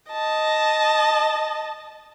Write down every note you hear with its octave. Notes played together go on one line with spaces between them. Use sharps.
D#5 A5